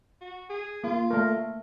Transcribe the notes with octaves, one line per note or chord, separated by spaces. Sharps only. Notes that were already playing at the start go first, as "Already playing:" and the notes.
F#4
G#4
A#3 F4
A3 A#4